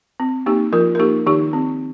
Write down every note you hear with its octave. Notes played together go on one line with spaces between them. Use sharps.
C4
A#3 D#4 G4
F3 F4 A#4
A#4
A#3 D#4 G4
D#3 D#4 G4
C4